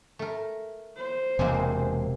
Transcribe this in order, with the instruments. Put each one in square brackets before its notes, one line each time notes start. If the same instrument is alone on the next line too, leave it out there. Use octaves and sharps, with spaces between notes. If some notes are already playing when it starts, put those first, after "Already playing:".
[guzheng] A3 A#4
[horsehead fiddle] C5
[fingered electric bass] E1 [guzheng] C3 G#3 A#3